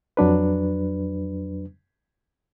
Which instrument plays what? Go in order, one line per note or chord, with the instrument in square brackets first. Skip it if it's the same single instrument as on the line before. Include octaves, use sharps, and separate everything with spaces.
[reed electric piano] F2 F#3 D4 B4